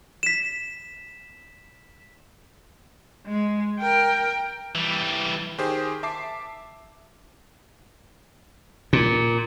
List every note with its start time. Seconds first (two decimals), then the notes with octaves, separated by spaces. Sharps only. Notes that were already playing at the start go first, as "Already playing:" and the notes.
0.23 B6 E7
3.26 G#3
3.79 A#4 G5
4.75 E3 G3
5.58 D#3 G4 G#4 C5
6.03 E5 A5 D6 C7
8.93 A#2